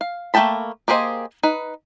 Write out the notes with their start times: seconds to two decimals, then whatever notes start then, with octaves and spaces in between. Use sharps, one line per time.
0.01 F5
0.34 A3 A#3 G5 A5 B5
0.88 A#3 G4 G#4 C5 D#5
1.43 D#4 B4